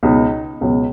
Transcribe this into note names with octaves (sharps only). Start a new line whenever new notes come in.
C#2 B2 F#3 D#4
C#2 B2 F#3